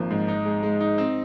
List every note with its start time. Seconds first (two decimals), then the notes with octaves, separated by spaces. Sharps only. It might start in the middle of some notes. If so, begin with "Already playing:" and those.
Already playing: G#1 F3 A#3
0.10 G#2
0.28 D#4
0.45 G#3
0.63 G#3
0.80 D#4
0.98 C4